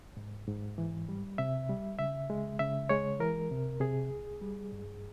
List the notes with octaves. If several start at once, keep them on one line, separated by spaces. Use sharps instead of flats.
G#2
G#2
E3
G3
C3 E5
G3
C#3 E5
G#3
C#3 E5
G#3 C#5
E3 A#4
C3
C3 G#4
C2
G3
G2